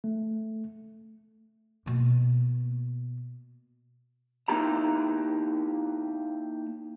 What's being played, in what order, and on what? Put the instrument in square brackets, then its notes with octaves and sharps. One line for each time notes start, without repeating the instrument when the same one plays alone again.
[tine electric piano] A3
[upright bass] B2 A#3
[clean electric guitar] A#3 D#4 E4 G4 A#5